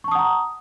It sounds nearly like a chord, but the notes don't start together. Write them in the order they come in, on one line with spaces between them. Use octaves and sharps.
C#6 A5 D#6 F#5 A#5